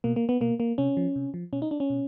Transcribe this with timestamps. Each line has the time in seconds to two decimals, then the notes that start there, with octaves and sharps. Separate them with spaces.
0.04 B2 A#3
0.16 A#3
0.29 B3
0.41 B2 A#3
0.60 A#3
0.78 C3 C#4
0.97 F3
1.16 C3
1.34 F3
1.53 B2 C#4
1.62 D#4
1.71 D4
1.80 C#4
1.90 B2